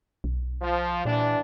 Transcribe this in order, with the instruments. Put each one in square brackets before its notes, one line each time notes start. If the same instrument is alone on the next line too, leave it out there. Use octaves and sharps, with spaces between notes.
[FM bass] B1
[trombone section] F3
[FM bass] A#2 [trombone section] E3 G3 D4